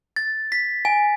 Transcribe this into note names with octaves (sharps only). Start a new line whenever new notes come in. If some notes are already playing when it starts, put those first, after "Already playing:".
A6
B6
G#5